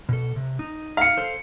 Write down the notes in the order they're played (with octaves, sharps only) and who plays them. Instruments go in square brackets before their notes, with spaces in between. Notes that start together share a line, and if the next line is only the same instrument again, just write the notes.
[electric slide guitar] B2 A4
C3
D#4
[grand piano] F5 C#7
[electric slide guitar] A4 C5